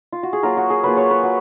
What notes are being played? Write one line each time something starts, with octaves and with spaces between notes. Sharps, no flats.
F4
F#4
G#4
F#3 A#3 F4 A#4
F#4
G#4
F#3 A#3 F4 B4
C#5
B4
F#3